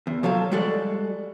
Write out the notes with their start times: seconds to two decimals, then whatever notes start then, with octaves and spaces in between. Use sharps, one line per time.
0.07 E2
0.23 F3 F#3 A4 F5
0.52 G3 G#3 F#4 A4 D5